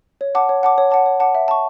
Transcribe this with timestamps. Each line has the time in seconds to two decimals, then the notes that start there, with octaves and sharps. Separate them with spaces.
0.21 C#5
0.35 F#5 A5 D6
0.49 C#5
0.63 F#5 A5 D6
0.78 C#5
0.91 F#5 A5 D6
1.06 C#5
1.20 F#5 A5 D6
1.35 E5
1.48 A5 C#6